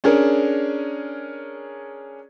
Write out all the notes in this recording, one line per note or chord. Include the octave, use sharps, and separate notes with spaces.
C#4 D4 G#4 A#4